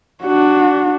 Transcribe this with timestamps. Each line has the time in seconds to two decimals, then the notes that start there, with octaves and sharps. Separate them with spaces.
0.23 D4 F#4